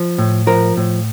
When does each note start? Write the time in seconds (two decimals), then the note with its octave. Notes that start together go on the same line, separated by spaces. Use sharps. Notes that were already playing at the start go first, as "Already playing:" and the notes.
Already playing: F3
0.18 A2
0.47 F3 A#4
0.77 A2